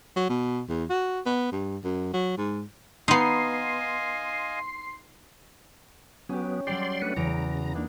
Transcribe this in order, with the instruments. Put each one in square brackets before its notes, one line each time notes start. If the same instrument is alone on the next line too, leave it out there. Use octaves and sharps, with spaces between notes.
[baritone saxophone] F#3
B2
E2
F#4
B3
G2
F#2
F#3
G#2
[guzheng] B3 D#4 [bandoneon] D#5 F5 G#5 [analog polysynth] C6 C7
[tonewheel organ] F#3 B3 [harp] C#4 G4
[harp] F#3 G3 G4 [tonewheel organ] D5 C6
[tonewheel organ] A3 D4 B4 [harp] C#7
[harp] E2 D7 [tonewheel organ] C#3 A#5
[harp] A#3 D4 D#4